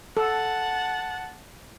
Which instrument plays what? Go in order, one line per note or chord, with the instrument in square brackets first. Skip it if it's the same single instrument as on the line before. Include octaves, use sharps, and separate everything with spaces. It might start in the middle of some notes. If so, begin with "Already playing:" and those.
[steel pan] A4 [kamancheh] F#5 A5